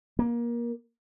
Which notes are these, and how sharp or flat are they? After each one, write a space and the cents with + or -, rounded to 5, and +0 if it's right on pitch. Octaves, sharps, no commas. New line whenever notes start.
A#3 +25